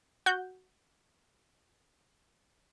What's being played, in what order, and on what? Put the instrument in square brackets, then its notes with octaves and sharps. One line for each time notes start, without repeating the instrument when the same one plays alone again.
[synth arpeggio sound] F#4 G6